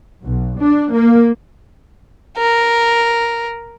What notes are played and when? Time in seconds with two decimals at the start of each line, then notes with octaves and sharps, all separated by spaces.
0.25 B1
0.59 D4
0.92 A#3
2.37 A#4